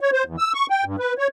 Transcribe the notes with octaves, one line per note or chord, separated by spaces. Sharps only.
C#5
C5
E2
E6
C#6
G5
G2
B4
C#5